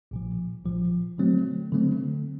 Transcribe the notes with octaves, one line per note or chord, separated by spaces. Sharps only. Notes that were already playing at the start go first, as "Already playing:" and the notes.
A#1 A#2 F3
A#1 A#2 F3
D3 F#3 A3 C4
D3 F#3 A3 C4